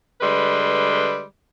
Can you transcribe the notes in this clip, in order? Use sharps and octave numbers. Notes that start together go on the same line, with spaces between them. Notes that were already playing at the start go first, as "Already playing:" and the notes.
D3 G3 G#3 B4